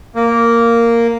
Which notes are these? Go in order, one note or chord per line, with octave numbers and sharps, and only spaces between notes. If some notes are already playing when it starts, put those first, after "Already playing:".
A#3